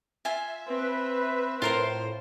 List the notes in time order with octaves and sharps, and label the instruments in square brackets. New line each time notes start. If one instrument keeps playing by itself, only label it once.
[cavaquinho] F4 G#5 [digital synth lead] E5
[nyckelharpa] C4 [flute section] B4
[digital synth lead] A2 [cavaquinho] F4 A#4 C6 [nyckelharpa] C5